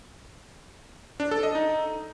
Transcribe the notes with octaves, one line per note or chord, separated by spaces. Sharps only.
D4
A4
D#5
D#4